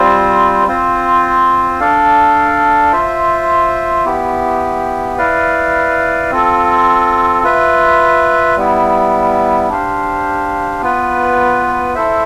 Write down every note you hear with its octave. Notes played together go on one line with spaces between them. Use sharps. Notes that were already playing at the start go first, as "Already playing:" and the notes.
Already playing: G3 C4 F4 C5
C4 F4 C5
D4 A4 D5 F5
F4 C5 E5
B3 E4 G4
E4 B4 D5 F5
C4 F4 A4
F4 B4 E5
G3 B3 E4
D4 G4 C5 F5
B3 F4 B4
E4 A4 C5 E5